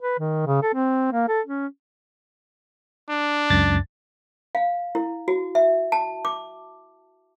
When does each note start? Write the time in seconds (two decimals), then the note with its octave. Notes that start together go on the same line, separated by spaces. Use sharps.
0.01 B4
0.19 D#3
0.46 C#3
0.62 A4
0.74 C4
1.12 A#3
1.28 A4
1.46 C#4
3.10 D4
3.50 C#2 F#2 A6
4.55 F5
4.95 E4
5.28 F#4
5.55 E5
5.92 A5
6.25 D6